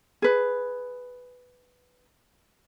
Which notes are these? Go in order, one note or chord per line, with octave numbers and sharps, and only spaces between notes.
G#4 B4